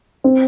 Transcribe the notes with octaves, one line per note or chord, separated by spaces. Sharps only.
C4